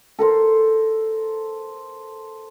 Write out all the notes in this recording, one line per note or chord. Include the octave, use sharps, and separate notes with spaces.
A4 A#4 C5